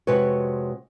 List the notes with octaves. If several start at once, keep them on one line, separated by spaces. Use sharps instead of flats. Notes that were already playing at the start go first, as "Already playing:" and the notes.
F2 C3 G#3 F#4 B4 C#5